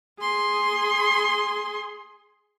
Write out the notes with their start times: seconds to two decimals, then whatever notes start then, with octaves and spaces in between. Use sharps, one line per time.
0.20 G#4 C6